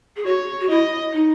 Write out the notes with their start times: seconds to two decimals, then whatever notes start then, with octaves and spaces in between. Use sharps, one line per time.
0.16 G#4
0.26 F#4 C#5
0.61 F#4
0.70 E4 D#5
1.13 D#4